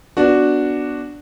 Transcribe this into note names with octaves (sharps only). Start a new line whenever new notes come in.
B3 D4 F#4